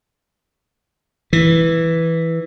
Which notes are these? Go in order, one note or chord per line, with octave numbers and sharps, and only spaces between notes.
E3